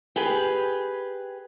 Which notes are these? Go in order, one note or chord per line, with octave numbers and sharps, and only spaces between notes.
G4 G#4 B4